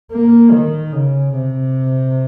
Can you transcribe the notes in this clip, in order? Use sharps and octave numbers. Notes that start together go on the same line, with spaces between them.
A#3
D#3
C#3
C3